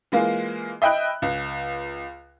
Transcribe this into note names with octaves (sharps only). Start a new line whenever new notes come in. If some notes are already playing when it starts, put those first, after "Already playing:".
E3 G#3 A#3 F4
D#5 E5 G5 B5 F#6
C#2